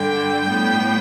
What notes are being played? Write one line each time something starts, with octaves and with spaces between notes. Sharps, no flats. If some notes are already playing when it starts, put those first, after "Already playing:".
Already playing: G2 D3 G3 G5
A2 G3 B3